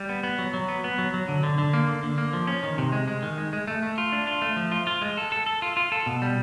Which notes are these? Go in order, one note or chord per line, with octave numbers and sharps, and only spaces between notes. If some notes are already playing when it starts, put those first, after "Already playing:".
Already playing: G3
B3
B3
F#3
F#3
B3
B3
F#3
F#3
D3
D3
D3
A#3
D3
D3
A#3
F3
C#4
D#3
C3
G#3
G#3
D#3
G#3
G#3
A3
A3
F4
D4
F4
A3
F3
F4
F4
G#3
A4
A4
A4
F4
F4
A4
B2
G3